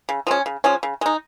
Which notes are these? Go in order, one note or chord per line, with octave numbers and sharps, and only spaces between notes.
C#3
F3 G#3 C#4
C#3
F3 G#3 C#4
C#3
G#3 D#4